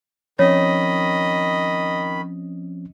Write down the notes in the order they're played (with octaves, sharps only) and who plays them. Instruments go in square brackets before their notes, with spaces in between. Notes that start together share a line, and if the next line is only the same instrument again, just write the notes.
[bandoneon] D#3 B5 [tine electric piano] F3 C4 C#4 [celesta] C#5 [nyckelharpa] D#5